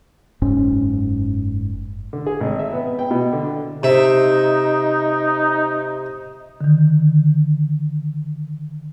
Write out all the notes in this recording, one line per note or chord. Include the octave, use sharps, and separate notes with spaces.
F#1 G#2 C#4
D3
G#4
G#1
E5
B3
G5
B2
D3
C3 D#4 E5
D3 D#3